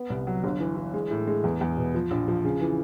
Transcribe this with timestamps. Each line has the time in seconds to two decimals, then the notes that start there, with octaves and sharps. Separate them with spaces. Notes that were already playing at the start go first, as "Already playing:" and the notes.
Already playing: B3
0.10 C2
0.27 F#3
0.44 G1
0.60 E3
0.77 E3
0.94 G#3
1.11 A2
1.27 G#3
1.44 E2
1.61 E2
1.77 B2
1.94 F3
2.11 A#1
2.28 F3
2.45 C#3
2.61 E3